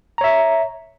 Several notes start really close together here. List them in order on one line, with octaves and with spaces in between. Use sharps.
A#5 C#5 E5